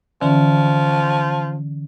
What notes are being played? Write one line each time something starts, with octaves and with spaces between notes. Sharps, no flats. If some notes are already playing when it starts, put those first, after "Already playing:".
D3 E3 F3 C#4